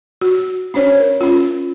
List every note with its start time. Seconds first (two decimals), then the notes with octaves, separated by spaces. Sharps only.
0.21 F#4
0.74 C#4 D4 C5 C#5
0.99 A#4
1.21 C#4 F4